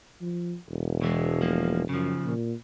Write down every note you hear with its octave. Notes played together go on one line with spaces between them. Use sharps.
F3
E1
B2 E3 G#3
F3 A#3
F#2 C#3 F3
A#2